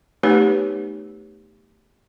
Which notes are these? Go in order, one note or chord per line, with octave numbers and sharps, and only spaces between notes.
A3 B3 D#4 G4 B4 C#5